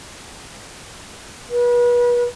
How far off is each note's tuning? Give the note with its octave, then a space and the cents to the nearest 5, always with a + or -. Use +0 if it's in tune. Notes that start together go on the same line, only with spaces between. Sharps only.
B4 -35